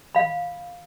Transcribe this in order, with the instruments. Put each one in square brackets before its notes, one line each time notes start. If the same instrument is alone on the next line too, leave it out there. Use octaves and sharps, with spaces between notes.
[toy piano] F5 B5